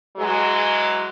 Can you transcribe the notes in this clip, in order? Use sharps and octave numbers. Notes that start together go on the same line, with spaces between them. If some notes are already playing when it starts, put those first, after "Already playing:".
E3 F#3 G#3